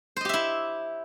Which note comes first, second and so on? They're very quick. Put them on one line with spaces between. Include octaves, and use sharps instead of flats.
C5 D#5 G4 E5 E4